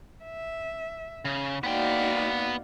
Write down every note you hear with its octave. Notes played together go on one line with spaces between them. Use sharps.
E5
C#3
A#3 B3 D#4 F#4 D5 F5 G5